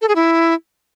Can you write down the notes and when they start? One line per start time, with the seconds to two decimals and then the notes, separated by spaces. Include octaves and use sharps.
0.02 A4
0.09 G#4
0.16 E4